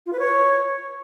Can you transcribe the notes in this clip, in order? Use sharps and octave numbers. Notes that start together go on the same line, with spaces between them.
F4
B4
C#5